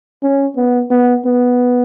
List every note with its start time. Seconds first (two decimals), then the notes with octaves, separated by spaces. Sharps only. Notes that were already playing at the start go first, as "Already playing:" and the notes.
0.23 C#4
0.56 B3
0.91 B3
1.25 B3